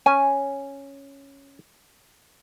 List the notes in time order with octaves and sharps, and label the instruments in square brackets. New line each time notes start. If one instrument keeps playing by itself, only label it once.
[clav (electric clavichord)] C#4 [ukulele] G#5